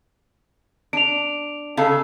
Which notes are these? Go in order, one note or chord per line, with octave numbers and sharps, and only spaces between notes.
D4 D7 F7
C#3 G#4 A4 F5